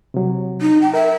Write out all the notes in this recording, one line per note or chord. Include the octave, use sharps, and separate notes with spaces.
C3 F#3
D#4
G5
A#4 E5